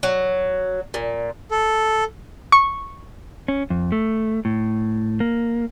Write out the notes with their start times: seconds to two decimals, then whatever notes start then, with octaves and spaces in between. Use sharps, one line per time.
0.03 F#3
0.94 A#2
1.51 A4
2.52 C#6
3.48 C#4
3.70 F2
3.92 A3
4.45 A2
5.20 A#3